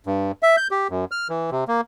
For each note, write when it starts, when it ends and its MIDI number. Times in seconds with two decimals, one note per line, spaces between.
0.06 0.32 43
0.43 0.56 76
0.57 0.68 91
0.71 0.87 67
0.90 1.05 42
1.11 1.28 89
1.29 1.50 52
1.51 1.64 48
1.68 1.81 58